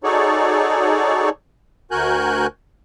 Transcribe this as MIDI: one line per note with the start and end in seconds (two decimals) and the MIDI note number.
0.04 1.29 63
0.04 1.29 66
0.04 1.29 68
0.04 1.29 69
0.04 1.29 73
0.04 1.29 74
1.91 2.47 38
1.91 2.47 66
1.91 2.47 70
1.91 2.47 80
1.91 2.47 90
1.91 2.47 91